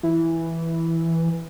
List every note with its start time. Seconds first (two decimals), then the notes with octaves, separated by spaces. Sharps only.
0.03 E3